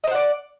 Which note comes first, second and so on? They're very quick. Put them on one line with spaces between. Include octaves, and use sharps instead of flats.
D#5 C5 F#5 D5